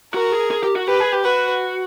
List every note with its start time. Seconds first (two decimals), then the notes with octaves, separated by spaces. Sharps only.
0.14 F#4 A#4
0.32 G#4
0.51 G#4
0.63 G4
0.76 F#4
0.88 G4 B4
1.00 G#4
1.13 G4
1.24 F#4 B4